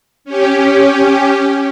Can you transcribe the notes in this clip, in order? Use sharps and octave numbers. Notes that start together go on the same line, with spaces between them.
C#4 G4